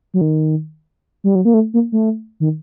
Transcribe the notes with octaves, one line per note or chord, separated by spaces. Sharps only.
F#3
D#3
G3
F#3
A#3
A3
A#3
A3
D#3